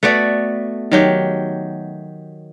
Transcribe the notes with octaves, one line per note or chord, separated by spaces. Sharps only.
A3 B3 F#4 D5
D#3 F#3 G4